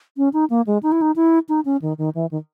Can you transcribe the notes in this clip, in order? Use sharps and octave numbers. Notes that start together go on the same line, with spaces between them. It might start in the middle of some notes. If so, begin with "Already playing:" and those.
C#4
D#4
A#3
G#3
D#4
E4
D#4
E4
D#4
C#4
D#3
D#3
E3
D#3